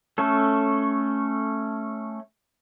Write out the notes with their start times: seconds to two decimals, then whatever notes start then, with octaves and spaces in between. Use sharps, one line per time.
0.18 A3 C#4 A4